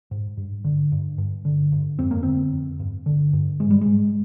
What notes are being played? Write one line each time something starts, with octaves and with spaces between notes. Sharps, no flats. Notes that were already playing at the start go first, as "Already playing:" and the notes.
G#2
G2
D3
G2
G2
D3
G2
F2 C4
A#3
D3 C4
F2
G2
D3
G2
G#2 G#3
G3
G#3
G#2